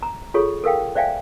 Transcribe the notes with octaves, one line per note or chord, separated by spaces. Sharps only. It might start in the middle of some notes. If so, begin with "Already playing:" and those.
A#5
F4 G#4 A4 C#5 C#6
A4 A#4 F5 G5
C5 D5 E5 F5 G5 G#5